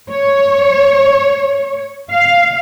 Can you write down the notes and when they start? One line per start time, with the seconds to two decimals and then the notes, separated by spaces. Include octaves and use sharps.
0.10 C#5
2.11 F5